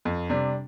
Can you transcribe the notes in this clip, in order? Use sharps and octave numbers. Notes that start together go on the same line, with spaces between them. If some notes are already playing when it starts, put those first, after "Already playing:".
F2
C3 G3 D4